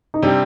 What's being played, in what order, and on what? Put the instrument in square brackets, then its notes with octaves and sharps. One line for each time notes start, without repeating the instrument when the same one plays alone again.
[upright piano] D#4
[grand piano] C3 G3 C4 [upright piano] D4